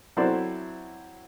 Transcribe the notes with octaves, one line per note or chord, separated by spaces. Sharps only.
F#3 C4 E4 A4 C5 D5